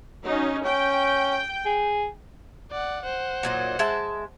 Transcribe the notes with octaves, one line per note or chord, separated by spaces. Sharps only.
F#3 C#4 D#4
C#4 G5
G#4
D5 F#5
C5 F#5
A#2 F#3 D#4
G#3 E5 A5